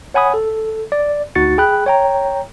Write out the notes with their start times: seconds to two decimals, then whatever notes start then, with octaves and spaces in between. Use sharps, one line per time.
0.14 C#5 F#5 G#5 B5 D#6
0.34 A4
0.92 D5
1.35 D2 D#4 F#4 A6 C#7
1.58 G#4 G5 B5 F#6
1.86 C#5 G5 A#5